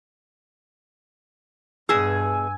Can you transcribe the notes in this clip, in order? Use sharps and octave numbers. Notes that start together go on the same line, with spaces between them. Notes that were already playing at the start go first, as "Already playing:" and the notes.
G2 B2 G#4 G#5 E6